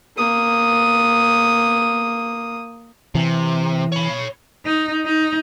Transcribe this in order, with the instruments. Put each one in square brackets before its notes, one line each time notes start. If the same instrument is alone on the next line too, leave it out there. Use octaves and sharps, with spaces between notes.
[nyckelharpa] A#3 D#6
[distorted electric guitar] C3 [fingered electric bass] E3
[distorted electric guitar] C#5 B5
[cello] D#4
D#4